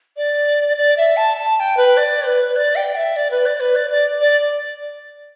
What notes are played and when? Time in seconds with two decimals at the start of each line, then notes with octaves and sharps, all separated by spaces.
0.17 D5
0.77 D5
0.97 E5
1.17 A5
1.37 A5
1.57 A5
1.60 G5
1.77 B4
1.97 D5
2.27 B4
2.56 D5
2.76 G5
2.96 E5
3.16 D5
3.31 B4
3.46 D5
3.60 B4
3.76 D5
3.91 D5
4.21 D5